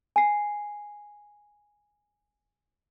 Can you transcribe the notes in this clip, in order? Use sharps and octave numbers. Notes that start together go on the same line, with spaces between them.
G#5 C7